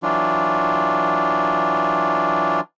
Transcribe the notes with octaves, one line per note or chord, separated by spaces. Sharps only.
E3 F#3 D4 F4